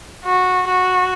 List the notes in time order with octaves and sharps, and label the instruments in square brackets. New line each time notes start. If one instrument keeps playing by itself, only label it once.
[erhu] F#4
F#4